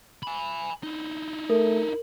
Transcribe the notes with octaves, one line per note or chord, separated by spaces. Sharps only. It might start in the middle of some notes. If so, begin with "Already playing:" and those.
G#5 B5
D#4 E4
A3 A#4